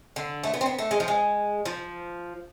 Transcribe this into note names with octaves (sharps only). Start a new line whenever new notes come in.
D3
A3
B3
C4
B3
A3
G#3
F3
G#3
F3